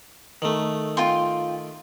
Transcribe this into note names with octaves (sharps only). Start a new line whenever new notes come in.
D#3 A3
F4 G5 C6